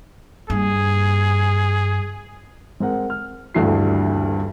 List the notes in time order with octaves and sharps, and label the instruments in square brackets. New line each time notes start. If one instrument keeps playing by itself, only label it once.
[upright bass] G2 A#3 [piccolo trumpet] G#4
[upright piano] G#3 C4 A#4 F#5
F6
D#1 D2 G2 E3 F#4 C7